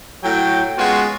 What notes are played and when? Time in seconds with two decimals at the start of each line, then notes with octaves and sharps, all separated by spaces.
0.23 A2 F#3 G5
0.78 G#3 B3 C#4 F4 F#4